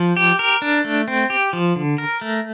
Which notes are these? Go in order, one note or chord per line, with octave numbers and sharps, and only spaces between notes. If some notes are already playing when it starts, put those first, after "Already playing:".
Already playing: F3
G4
A#4
D4
A3
C4
G4
F3
D3
A#4
A3